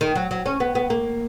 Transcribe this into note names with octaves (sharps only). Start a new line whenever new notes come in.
D#3
F#3
F#3
C#4
B3
B3
A#3